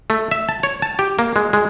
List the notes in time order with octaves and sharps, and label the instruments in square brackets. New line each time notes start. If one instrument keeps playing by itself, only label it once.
[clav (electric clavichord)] A3
E5
A5
C#5
A5
G4
A#3
G#3
G#3